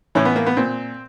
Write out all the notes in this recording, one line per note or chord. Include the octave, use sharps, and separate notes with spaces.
A2 E3 C#4
B3
A#3
B3
A#2 C4